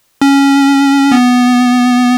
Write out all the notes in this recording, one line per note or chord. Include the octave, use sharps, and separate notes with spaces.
C#4
B3